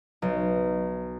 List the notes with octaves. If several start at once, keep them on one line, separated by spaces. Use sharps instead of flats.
B1